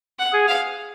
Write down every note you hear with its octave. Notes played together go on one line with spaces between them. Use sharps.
F#5
G#4
F5